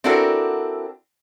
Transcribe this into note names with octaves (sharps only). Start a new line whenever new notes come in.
C4 D4 E4 F#4 A4 A#4